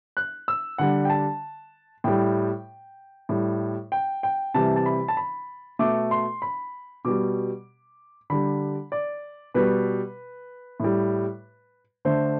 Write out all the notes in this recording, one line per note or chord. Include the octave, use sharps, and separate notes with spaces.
F#6
E6
D3 G3 F#5
G5
A5
A2 G3 G5
A2 G3
G5
G5
C3 E3 G3 A5
A5
B5
A5
B5
B2 A3 D6
C6
B5
B2 G3 D6
D3 G3 B5
D5
B2 G3 B4
A2 G3
D3 A3 C5